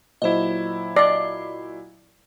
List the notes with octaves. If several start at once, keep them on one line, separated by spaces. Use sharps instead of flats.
A#2 F#3 E4 C5 D#5
D5 D#5 C7